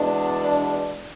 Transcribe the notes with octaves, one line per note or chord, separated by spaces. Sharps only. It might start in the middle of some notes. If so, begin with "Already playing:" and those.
Already playing: E2 B2 G#3 D4